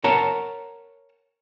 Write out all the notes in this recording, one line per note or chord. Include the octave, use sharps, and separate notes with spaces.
A#4 C#5 F#5 A5 A#5